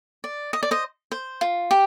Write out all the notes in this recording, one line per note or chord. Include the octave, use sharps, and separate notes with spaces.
D5
D#5
D5
C5 D#5
C5
F4
G4